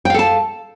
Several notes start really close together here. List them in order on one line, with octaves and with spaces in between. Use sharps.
G5 F5 A4 A5